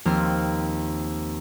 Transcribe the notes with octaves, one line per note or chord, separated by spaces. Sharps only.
D#2 F3 C4 F6